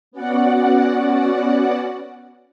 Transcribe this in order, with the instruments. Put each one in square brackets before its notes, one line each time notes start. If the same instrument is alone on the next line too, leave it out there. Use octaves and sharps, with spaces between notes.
[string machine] B3 C#4 F#4 D5 F#5